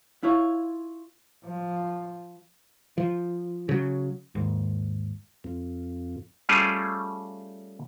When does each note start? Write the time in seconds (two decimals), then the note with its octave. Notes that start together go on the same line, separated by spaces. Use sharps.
0.23 E4 F4 C#5
1.45 F3
2.98 F3
3.69 C#3 F#3
4.35 D#2 G#2
5.44 F2
6.49 G3 A3 C#4 F4 G4 G#4